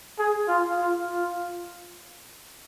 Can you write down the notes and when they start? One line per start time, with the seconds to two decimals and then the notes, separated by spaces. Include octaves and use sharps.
0.19 G#4
0.48 F4
0.77 F4
1.07 F4